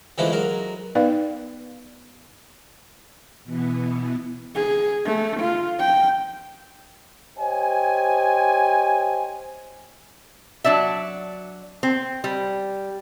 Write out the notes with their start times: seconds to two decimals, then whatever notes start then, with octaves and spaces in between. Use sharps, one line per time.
0.18 D3 E3 F3 G#3 A3 C#4
0.32 F#3 G#3 A#4
0.95 B3 D#4 B4 D5 F5
3.44 B2 E3 B3 E4
4.55 G#4
5.06 A3
5.41 F4
5.79 G5
7.38 G4 C5 C#5 D#5 G5 G#5
10.64 F#3 D4 D5 E5
11.83 C4
12.24 G3